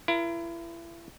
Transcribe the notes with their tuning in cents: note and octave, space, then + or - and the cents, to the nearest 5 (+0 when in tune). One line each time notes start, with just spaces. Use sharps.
E4 +35 A#4 +30